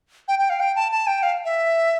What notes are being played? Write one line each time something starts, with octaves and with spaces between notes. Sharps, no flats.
G5
G5
F5
G5
A5
A5
G5
F5
E5